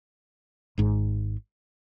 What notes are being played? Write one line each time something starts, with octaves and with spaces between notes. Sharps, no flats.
G#1 G#2